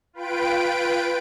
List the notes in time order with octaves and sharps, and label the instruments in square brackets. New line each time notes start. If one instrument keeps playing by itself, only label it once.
[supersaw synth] F4 B4 G5 D7